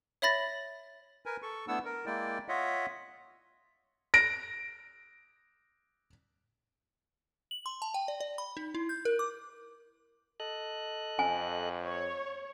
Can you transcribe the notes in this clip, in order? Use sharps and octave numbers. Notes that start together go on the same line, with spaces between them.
C#5 E5 B5 A6 A#6
A#4 B4 G#5
A4 C#6
A3 B3 D4 E4 F#5 E6
A#4
G#3 A#3 E4 D5 G5
F4 C#5 D#5 E5 F#5
A#6 D7
F#7
C6
A5
G5
D5
D5
B5
D#4
E4
G6
A#4
D6
A4 D#5 F#6
F2 G#5
C#5